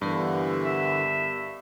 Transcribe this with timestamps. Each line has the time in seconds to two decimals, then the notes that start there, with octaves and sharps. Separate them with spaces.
0.02 G2 D3 E3 B3 G4 A#4
0.64 E5